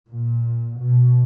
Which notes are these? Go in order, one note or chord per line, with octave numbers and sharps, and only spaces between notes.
A#2
B2